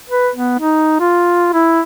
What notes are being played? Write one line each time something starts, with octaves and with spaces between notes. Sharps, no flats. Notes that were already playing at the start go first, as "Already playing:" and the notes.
B4
B3
D#4
F4
E4